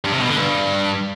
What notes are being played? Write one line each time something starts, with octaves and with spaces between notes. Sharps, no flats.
G2
C3
B2
D3
G2